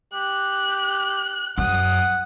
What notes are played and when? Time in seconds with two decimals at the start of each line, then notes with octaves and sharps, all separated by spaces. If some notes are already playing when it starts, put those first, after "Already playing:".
0.13 G4 F#6
1.58 F#2 F#5 D#6